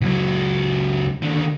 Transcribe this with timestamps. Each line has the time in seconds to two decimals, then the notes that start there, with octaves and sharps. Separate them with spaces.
0.01 C#2 F#3
1.23 D#2 D3